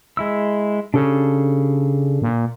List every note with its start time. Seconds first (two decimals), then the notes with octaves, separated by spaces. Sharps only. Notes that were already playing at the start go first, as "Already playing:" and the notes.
0.17 G#3 E4 E6
0.94 C#3 D4 G4 A4
2.22 A#2